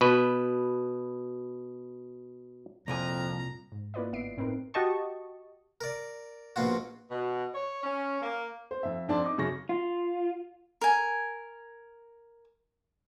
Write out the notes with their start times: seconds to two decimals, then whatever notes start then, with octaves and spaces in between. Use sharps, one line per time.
0.01 B2 B4
2.88 C2 F2 A#2 G#5 A#5
3.72 G#2
3.94 A#3 E4 F4 B4 D5 D#5
4.12 G1 B3 E5 C7 D7
4.37 A2 C4 D#4 A#4 B4
4.74 F#4 G4 D#5 A5 C#6
5.81 A#4 D5
6.56 A#1 B2 A#3 F4 F#4
7.11 B2
7.54 C#5
7.83 C#4
8.22 A#3
8.71 C5
8.83 F2 E5
9.08 F2 D4 A5 C6
9.24 D#4 D6
9.38 F#2 C#3 C#6 A#6
9.69 F4
10.81 A#4 G#5